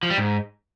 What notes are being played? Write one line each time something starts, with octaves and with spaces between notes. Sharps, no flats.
F3
G3
G#2